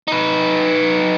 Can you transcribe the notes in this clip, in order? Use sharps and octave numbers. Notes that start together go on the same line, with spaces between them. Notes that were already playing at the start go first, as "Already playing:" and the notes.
D#4 B4